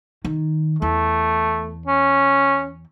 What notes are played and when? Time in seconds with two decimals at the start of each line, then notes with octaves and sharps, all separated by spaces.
0.24 D#3
0.82 E2 A3
1.87 C#4